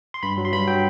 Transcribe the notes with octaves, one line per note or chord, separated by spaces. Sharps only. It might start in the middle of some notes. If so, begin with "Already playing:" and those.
C6
G2 B5
F#3
C6
G2 B5
F#3 G5